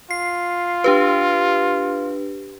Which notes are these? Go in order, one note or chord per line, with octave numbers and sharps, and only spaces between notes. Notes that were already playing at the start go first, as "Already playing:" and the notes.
F4 C7
D4 G4 B4